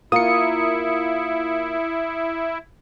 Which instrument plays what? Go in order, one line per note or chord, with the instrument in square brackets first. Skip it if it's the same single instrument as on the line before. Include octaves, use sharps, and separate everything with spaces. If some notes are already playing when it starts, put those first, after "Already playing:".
[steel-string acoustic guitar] A#3 F4 A#4 [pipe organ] E4 [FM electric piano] D#6 C#7